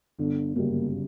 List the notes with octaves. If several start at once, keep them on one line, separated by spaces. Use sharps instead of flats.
G1 D3
F#2 C#3 G3 A#3